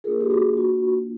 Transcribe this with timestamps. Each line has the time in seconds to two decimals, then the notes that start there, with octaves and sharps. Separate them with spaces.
0.04 A#3 D4 F4 G#4 A#4
0.21 G4
0.30 F#4 G#4
0.57 F#4